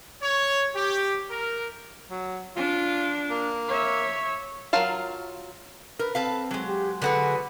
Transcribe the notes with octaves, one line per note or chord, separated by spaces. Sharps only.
C#5
G4
A#4
F#3
D4 F4
A#3
C#5 E5
F#3 F4 A#4 F5 A5
A#4 B4
C4 A4 B4 F5
F#3 G#3
G4
D3 F#4 G#4 B4